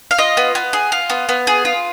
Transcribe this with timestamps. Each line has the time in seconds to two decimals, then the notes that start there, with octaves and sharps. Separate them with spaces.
0.11 F5
0.18 F4 D#5
0.37 B3
0.55 B3
0.73 G#4
0.92 F4
1.10 B3
1.29 B3
1.47 G#4
1.65 F4